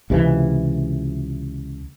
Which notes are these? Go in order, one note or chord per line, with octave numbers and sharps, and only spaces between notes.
C#2 C3 D#3 E3